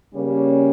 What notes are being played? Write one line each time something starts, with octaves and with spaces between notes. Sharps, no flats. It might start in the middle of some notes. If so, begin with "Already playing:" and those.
C#3 G3 A#3 C#4